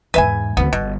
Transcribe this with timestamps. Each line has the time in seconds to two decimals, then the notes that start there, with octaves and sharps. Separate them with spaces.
0.14 E2 G#2 B4 E5 G#5
0.57 D2 B3 C4
0.73 G1 B2